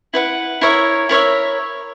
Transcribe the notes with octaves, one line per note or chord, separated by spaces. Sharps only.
E4 B4 F#5
E4 A#4 C#5 E5
E4 A#4 C#5 E5